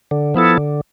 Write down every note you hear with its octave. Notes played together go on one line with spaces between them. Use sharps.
D3
F3 B3 E4 A4
D3